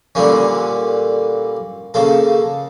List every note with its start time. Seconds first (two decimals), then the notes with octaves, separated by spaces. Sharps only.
0.15 A#2 D3 G3 A#3 C#4
1.94 C#3 A#3 A4